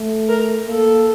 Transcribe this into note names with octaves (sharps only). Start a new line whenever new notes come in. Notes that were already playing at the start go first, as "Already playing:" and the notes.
Already playing: A3
A#4
A#3 A4